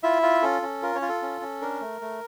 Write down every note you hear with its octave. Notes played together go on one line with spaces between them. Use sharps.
E4 F4 E5
F4
C#4 A4
C#4
F4 A#4
C#4 C#5
F4
A4
C#4
C#4
D4 A#4
A3
A3